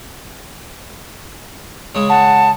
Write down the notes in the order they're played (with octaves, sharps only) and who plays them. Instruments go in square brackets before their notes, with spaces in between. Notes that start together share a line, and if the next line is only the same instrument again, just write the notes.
[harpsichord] C#3 G#3
[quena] F#5 [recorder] A5